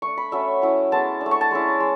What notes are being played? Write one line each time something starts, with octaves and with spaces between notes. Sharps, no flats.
A3 D4 C#6
B5
F#3 A3 C#4 E5
F#3 C#4 E4
G#3 B3 E4 A5
D4
A3
C#6
A5
G#3 C#4 E4
G#3